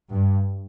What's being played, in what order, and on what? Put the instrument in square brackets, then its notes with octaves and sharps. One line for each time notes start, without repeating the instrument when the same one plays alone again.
[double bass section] G2